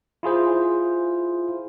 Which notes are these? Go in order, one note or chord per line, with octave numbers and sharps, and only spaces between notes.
E4 F4 G#4 C5